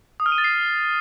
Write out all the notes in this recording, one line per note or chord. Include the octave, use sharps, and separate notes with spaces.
D#6
F6
D#7
A6
C7